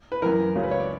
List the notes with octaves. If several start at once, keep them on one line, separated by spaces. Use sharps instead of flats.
B4
F#2 E3 A#4
C#2 C#3 F#3
B4
C#5
D5